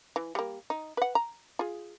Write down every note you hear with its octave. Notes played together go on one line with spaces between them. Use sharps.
E3
G3 A#3
D#4
B4 F#5
A#5
F4 G#4